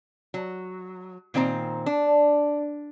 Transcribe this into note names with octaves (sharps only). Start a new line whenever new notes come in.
F#3
A#2 D#3 C4 C5 A#5
D4